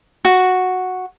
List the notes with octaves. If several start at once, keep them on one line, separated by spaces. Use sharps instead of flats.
F#4